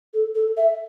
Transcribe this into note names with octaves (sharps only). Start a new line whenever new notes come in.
A4
A4
E5